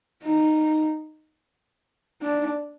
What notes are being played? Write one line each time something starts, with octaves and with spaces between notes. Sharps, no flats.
D#4
D4